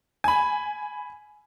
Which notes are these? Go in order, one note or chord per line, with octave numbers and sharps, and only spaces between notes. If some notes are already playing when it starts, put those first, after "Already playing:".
G#5 B5